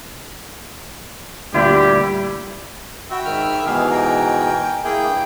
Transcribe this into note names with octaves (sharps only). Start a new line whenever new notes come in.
D2 A#2 G3 E4 G4 D5
F#4 E5 G5 B5
G#2 D#3 F6
G#2 B2 E3 G4 G#4 F5
A#4 G5 G#5
A#3 E4 G#4 G5
G2